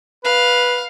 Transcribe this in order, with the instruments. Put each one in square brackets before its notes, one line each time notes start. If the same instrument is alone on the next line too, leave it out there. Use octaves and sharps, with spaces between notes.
[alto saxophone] B4 [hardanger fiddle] F5